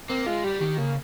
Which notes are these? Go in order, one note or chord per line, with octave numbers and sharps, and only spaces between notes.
A#3 C4
G#3 F4
G3 G4
D#3 G4
C#3 A#3